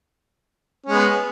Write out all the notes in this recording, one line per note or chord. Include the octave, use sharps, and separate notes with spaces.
G#3 B3 C#4